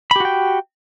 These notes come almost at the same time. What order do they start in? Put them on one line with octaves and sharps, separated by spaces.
B5 G4 F#4 G5